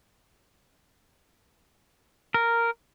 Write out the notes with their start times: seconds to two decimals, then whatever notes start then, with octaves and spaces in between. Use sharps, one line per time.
2.34 A#4